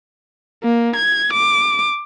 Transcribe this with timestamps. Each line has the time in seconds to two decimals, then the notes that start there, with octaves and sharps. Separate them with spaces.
0.64 A#3
0.96 G#6
1.33 D6